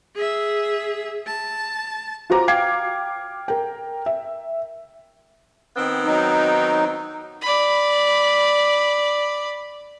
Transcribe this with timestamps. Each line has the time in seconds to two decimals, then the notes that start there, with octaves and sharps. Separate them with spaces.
0.15 G#4 E5
1.26 A5
2.30 F4 F#4 C5 A#5 D6
2.48 F5 G5 D6 G#6 C7
3.48 A#4 G5
4.06 E5
5.76 D#3 B3 C4
6.06 F#3 D#4
7.42 D5 B5